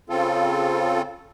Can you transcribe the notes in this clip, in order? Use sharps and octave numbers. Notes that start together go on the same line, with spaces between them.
C#3 C4 F4 A4